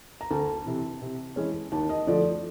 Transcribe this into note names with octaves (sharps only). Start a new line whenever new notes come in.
A#5
D2 A5
C3 E3
C3
E3 G#3 C#4
D#2 A5
D#5
D3 F3 A3 D5